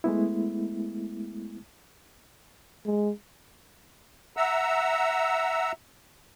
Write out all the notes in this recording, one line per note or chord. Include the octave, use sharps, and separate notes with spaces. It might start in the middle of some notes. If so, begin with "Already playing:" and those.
G#3 A3 B3 E4
G#3
E5 F#5 A#5 E6